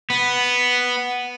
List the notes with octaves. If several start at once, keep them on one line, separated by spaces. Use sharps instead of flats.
B3